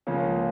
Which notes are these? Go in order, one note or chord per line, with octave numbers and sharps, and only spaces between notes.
C#2 C#3 F3 A#3 C#4